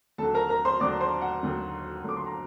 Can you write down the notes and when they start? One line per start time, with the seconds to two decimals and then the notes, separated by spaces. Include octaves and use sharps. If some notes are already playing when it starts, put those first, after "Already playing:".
0.18 D#2 D3 F#3 A4 A5
0.34 A#4 A#5
0.49 A#4 A#5
0.65 C5 C6
0.80 D#2 D3 F#3 D5 D6
1.01 C5 C6
1.21 F#5
1.43 D#2 D3 F#3
2.04 D#2 D3 F#3 D6
2.17 C6
2.26 A#5